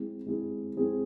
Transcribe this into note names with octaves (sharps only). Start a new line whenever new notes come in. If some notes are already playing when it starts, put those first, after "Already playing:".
Already playing: G#3 C4 E4 G#4
G#3 C4 E4 G#4
G#3 C4 E4 G#4